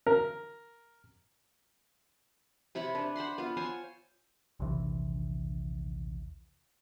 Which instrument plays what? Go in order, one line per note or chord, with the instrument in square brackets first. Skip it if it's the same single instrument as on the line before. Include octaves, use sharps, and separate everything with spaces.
[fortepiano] A#4
[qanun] C3 E4 C#5 B5
D4 B4
C5 F#5 B5 C6
B3 F4
C5 C#5 G#5 C6
[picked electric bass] A#1 D#2 C3 E3